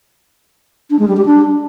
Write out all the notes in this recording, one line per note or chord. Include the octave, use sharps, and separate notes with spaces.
D4
G#3
G3
G4
D4